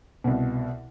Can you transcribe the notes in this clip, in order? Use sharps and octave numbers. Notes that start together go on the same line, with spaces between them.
C2 B2